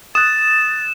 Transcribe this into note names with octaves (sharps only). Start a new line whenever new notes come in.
D#6 F#6 A6 E7